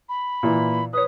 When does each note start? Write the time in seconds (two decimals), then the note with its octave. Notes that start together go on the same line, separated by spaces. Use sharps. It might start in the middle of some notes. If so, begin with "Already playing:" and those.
0.09 B5
0.43 A#2 E3
0.93 B4 C#5 D#6